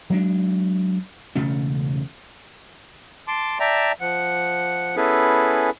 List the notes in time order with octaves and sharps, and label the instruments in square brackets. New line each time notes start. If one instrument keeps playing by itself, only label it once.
[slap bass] F#3 G#3 D4
E1 C#3 A3 C#4
[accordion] A5 C6 D6
D5 E5 G5 A5 A#5
F3 F#5
B3 C#4 E4 G#4 A4 B4